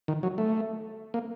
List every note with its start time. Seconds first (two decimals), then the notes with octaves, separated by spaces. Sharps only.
0.08 D#3
0.23 F#3
0.38 A3
1.14 A#3